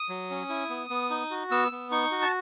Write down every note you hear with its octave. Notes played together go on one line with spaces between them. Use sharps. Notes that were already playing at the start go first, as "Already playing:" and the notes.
Already playing: D#6
F#3
C#4
E4
B3
B3
D#4
F#4
B3 E6
B3
D#4 C#6
F#4
A5